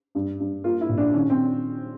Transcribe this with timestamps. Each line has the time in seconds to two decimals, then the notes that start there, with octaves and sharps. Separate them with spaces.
0.15 G2
0.40 G2
0.64 A#3 F4
0.81 E4
0.89 A#2
0.98 D4
1.14 D#3 C#4
1.30 C4